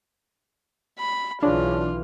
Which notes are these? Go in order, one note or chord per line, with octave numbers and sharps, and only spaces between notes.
B5
B1 C#3 E3 D4 F4